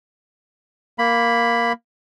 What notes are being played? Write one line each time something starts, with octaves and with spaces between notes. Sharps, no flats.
A#3 B5